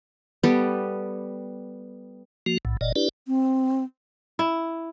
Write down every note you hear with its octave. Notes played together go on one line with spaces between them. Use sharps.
G3 B3 G4 A4
F3 A#3 F#4
B1 A2
F#1 A#2 D5 D#5
D4 E4 G4 B4 D5
C4
E4